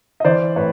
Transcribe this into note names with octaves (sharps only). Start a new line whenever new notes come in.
D#5
E3 C5 D5
A2 B4 C#5